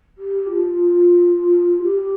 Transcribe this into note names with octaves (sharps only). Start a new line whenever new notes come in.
G4
F4
G4